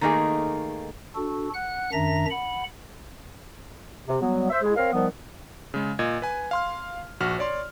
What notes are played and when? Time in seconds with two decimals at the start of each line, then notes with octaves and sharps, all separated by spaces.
0.01 D#3 A3 A#3 D#4 G#4
1.15 D4 F#4 A4
1.54 F#5 F#6
1.92 F#2 D#3 D4 E5 A#5 A#6
2.30 F#5 B5
4.07 C3
4.21 F#3 G3 B3
4.50 C5 E5
4.62 G#3 E4 G#4
4.76 C4 A#4 C#5 F5
4.92 D#3 F3 G3 B3
5.74 C#3 G#3
5.99 A#2 D#5 G#6
6.22 B4 G#5
6.51 F5 C6 F6
7.20 A#1 F#4 F6
7.39 C#5 D5 C6